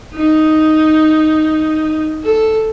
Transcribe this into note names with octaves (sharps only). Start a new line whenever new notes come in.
D#4
A4